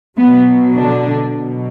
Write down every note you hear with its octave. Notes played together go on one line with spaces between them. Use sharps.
B2 F#3 B3
D3 D4
B2 F#3